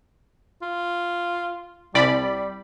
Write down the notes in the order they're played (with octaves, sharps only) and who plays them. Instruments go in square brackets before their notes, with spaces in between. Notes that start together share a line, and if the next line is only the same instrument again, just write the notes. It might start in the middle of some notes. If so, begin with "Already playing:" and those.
[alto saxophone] F4
[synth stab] C2 D5 B5 [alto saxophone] G3